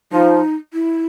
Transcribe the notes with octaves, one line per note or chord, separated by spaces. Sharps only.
F3 D#4
E4